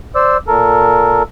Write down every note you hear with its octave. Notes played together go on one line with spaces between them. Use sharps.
C5 D5 E6
A#2 A4 A#4